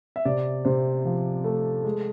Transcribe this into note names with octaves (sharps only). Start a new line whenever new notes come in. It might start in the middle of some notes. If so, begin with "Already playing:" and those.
E5
C3 D5
C3 C5
F3
A3
G#3